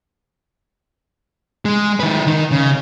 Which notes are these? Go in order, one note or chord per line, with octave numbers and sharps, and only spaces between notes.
G#3
D#3 B4
D#3 D#4
C#3